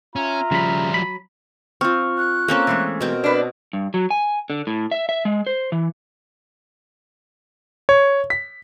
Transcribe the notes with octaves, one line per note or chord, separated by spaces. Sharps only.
C#4 F4 E5 A#5
C#3 F3 G3 B5
F#3 B5
C4 F4 C#6 F6
F#6
A#3 C4 C#4 A4
E3 G#3 A3
B2 C4 A#4
D4 B4
G2
F#3
G#5
D3
A2
E5
E5
G#3
C5
E3
C#5
B6